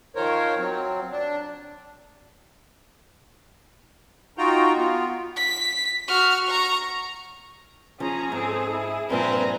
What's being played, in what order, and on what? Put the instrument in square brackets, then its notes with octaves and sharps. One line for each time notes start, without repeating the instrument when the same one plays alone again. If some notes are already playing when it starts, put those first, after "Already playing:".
[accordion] D#3 F3 A#4 C5 C#5
F#3 C4
D4
D#4 F4 F#4 G5 A#5
B3 F4
[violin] B6
F#4 F6
A#5 C#6
[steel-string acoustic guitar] F3 [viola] C#4 A#5 [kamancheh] G#4
[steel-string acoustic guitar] G#2 [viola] C4 A4
[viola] E4
[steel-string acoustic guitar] G2 A#2 F3 [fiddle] C4 [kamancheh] B4 G#5 [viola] A#5